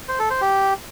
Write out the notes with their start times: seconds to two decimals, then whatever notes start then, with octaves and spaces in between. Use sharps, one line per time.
0.08 C5
0.19 A4
0.30 C5
0.41 G4